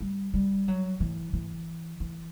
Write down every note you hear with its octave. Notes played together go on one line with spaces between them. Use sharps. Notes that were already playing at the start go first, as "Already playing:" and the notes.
G3
G3
F#3
E3
E3
E3